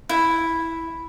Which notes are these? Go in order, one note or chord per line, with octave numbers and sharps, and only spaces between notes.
E4